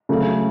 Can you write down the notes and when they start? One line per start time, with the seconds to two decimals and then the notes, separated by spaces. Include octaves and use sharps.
0.09 C#3 F#3 A3